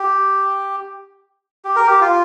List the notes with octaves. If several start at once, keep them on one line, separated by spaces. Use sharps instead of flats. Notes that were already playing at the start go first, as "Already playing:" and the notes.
Already playing: G4
G4
A#4
G4
F4